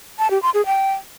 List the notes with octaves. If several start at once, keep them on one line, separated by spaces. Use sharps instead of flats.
A5
G4
C6
G#4
G5